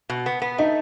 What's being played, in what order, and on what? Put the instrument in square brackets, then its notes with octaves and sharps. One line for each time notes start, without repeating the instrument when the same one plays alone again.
[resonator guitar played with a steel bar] B2
B3
B3
[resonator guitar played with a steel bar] A3 [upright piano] D#4